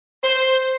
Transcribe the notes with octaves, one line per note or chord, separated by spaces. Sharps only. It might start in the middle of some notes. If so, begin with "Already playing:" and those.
C5